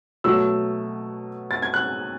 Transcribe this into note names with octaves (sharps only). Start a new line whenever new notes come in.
B2 F#3 A3 E6
A6
G#6
F#6